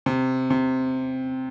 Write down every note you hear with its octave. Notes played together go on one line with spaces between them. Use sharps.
C3
C3